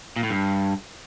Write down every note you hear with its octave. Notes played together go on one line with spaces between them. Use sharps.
A#2
A2
G2